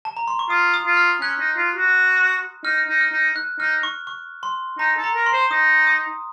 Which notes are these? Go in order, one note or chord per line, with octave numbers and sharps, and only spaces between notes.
A5
A#5
C6
C#6
F4 D#6
D#6
F4
F6
C#4 F#6
D#4
F4
F#4
D#4 F6
D#4
F6
D#4
F#6
D#4 F6
C#6
C#6
C6
D#4 A#5
A4
A#5
A#4
C6
C5
D#4 D#6
D#6